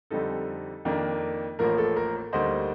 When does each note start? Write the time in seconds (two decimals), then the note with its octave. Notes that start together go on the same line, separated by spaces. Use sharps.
0.10 F2 D3 G3 C4 D#4 A4
0.85 F2 D#3 A#3 D4
1.59 A1 A2 F3 A#3 A#4
1.78 A4
1.96 A#4
2.33 D2 D3 G3 A#3 D#4 C5 D#5